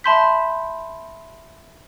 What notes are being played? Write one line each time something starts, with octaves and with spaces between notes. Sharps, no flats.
E5 A5 B5 C6 G6 B6